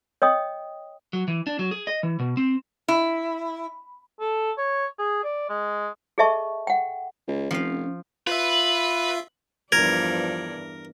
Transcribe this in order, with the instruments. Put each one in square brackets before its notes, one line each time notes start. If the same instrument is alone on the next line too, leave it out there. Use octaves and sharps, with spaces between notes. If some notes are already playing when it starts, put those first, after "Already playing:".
[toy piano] C#5 D#5 G5 D#6
[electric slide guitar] F#3
E3
D4
F#3
G#4
D#5
E3
B2
C4
[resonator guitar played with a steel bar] E4
[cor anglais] A4
C#5
G#4
D5
G#3
[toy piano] G#4 A4 D#5 E5 A5 C#6
F#5 G5
[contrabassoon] C#2
[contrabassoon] F1 [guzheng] F3 F5 [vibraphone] C#4
[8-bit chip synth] F4 E5 [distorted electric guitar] B4
[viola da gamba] E2 G2 D5 [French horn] F3 [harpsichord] A#4 [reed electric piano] G#6